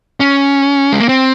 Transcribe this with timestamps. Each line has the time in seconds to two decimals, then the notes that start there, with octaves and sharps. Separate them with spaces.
0.20 C#4
0.92 G#3
1.00 A#3
1.09 C4